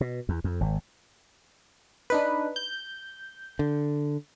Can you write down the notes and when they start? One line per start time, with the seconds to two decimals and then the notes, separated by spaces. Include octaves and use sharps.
0.01 B2
0.29 E2
0.44 F2
0.61 G#1
2.10 D4 D#4 B4
2.56 G6
3.59 D3